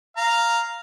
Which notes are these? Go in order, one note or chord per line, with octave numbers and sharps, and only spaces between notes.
F5 A#5